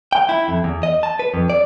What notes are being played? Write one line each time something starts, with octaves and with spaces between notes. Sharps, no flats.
G5
E4
F2
E2
D#5
A5
B4
F2
D5